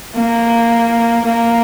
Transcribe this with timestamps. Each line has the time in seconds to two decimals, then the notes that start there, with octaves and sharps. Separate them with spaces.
0.15 A#3
1.25 A#3